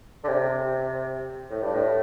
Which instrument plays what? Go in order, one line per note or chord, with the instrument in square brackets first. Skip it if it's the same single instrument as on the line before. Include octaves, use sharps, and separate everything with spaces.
[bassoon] D3
C3
A2
G2
A2